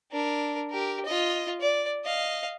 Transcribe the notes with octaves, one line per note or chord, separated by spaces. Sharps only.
D4 A#4
G4 A#4
F4 D#5
D5
D#5 F5